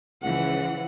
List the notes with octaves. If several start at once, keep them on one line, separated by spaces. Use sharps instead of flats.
C#2 C#3 E3 F3 F#5